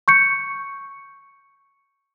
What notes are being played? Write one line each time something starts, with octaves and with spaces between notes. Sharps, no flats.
C#6 G6 C#7